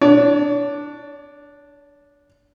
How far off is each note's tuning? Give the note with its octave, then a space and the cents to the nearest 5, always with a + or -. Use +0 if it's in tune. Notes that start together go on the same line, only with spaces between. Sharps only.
D4 +0 C#5 +40